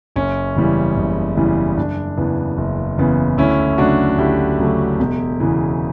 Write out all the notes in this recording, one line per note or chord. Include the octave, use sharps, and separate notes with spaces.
F#1 C#4
E2 C#3 E3 G3
F#1
E2 C#3 E3 G3
F#1 D4
E2 C#3 E3 B3
F#1
E2 C#3 E3 B3
D2 C#4 E4
C#3 F#3 A3 D4 F#4
D2 E4 G4
C#3 F#3 A3
E1
E2 C#3 E3